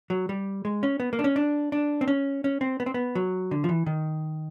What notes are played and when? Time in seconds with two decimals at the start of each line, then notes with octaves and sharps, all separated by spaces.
0.10 F#3
0.29 G3
0.65 G#3
0.83 C#4
1.00 B3
1.13 A#3
1.19 D4
1.24 C#4
1.36 D4
1.72 D4
2.01 C4
2.08 C#4
2.44 C#4
2.61 C4
2.80 B3
2.86 C4
2.94 B3
3.15 F#3
3.51 D3
3.64 F3
3.69 E3
3.86 D#3